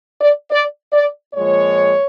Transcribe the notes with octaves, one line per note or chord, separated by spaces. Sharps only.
D5
D5
D5
A#2 F3 G#3 C#5